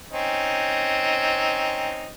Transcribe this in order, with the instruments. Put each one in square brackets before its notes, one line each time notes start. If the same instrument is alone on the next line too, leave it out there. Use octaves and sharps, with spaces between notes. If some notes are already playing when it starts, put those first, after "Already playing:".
[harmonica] C4 C#4 D#4